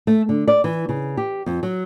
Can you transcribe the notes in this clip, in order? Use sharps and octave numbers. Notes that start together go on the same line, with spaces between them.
A3
D3
D5
E3
C#3
G4
F2
F#3